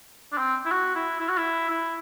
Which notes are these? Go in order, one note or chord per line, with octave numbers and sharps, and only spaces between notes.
D4
C4
E4
F#4
E4
E4
F#4
E4
E4